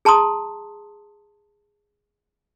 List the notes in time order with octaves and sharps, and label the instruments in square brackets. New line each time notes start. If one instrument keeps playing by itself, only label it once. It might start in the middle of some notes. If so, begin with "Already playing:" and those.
[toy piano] G#4 A5 A#5 C6 D#6